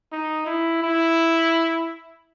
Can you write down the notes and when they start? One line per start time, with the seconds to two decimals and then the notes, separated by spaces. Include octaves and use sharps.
0.12 D#4
0.46 E4
0.83 E4